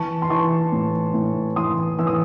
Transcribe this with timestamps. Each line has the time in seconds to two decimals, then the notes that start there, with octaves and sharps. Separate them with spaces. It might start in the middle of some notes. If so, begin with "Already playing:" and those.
Already playing: E3 A5 C#6
0.22 C6
0.30 E3 A5 C#6
0.72 A2
1.14 A2
1.56 E3 C6 D#6
1.99 E3 E6
2.07 D#6